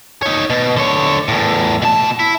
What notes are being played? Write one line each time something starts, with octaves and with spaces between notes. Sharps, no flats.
D#4 C#5
B2
D3 C#5
E2 A2
B2 A5
E4